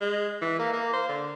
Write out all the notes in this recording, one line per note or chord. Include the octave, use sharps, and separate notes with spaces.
G#3
E3
A#3
A#3
C5
D3